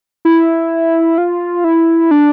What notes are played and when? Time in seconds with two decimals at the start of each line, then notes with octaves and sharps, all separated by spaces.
0.25 E4
1.18 F4
1.64 E4
2.11 D4